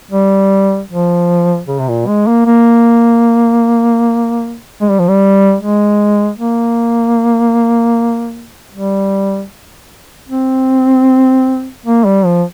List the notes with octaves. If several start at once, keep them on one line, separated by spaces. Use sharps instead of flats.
G3
F3
C#3
C3
A#2
G#3
A#3
A#3
G#3
G3
F3
G3
G#3
A#3
G3
C4
A#3
G3
F3